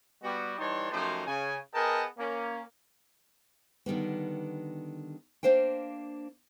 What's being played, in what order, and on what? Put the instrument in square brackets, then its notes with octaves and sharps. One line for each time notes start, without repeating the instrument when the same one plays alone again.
[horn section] G3 B3 F#4
E3 G3 D#4 C#5 A5 C6
F#2 F3 A3 D#4 G4 C5
C#3 G#5
B3 G#4 A#4 D#5 G5 A5
A#3 C#4
[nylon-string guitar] D3 D#3 G3 B3
A#3 D4 C5 F5 G5